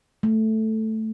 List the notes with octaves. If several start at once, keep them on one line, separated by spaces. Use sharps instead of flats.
A3